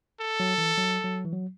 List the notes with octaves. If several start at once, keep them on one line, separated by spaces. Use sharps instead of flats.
A4
F#3
E3
F#3
F#3
E3
F#3